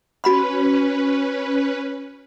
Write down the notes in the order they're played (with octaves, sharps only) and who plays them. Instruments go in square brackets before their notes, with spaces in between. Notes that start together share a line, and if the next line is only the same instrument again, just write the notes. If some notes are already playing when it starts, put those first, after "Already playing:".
[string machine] C#4 B4 [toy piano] F#4 B5 C6